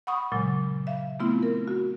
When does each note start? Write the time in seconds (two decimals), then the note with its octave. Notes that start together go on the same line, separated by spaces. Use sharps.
0.07 F#5 B5 C#6 D#6
0.32 A#2 C#3 F#3 G#3
0.87 E5 F5
1.19 A3 B3 C4 E4 F4
1.43 A#4
1.68 F#4